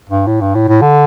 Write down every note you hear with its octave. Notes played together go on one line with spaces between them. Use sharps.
G2
A2
G2
A2
A2
D3